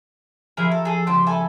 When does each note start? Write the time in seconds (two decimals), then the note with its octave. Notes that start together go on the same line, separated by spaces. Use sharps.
0.57 F3 E4 G4 G#4 A#4
0.72 A4 A#5
0.85 G#4 A4
1.07 C#2 G4 C5
1.26 A4 E5 G#5 B5